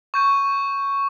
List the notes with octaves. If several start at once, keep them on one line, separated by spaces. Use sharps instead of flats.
C#6 G6 D#7